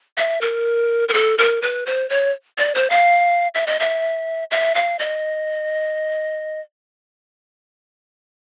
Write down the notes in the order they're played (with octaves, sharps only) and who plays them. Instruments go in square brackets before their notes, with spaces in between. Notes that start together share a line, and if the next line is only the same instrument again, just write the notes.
[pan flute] E5
A#4
A#4
A4
A#4
B4
C5
C#5
D5
C5
F5
E5
D#5
E5
E5
F5
D#5